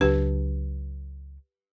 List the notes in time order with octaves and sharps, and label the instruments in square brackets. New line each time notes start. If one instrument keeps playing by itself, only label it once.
[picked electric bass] C#2 F#3 D4 [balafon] G4 B4